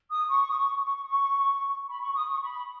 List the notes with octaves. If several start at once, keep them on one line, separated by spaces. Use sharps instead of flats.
D#6
C#6
D#6
C#6
C#6
C#6
B5
C#6
D#6
C#6
B5